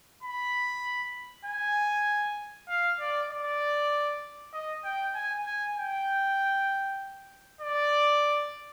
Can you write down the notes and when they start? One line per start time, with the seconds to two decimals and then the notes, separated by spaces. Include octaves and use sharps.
0.23 B5
1.45 G#5
2.68 F5
3.00 D5
3.30 D5
4.54 D#5
4.84 G5
5.15 G#5
5.46 G#5
5.76 G5
7.61 D5